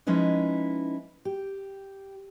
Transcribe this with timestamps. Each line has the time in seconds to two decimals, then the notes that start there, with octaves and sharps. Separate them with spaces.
0.07 F3 G#3 C#4 D#4 E4 B4
1.25 G4